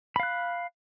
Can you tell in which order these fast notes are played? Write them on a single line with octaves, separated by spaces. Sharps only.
B5 F5 F#6